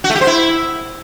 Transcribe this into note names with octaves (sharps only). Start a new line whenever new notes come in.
F#4
A3
G4
C5
E4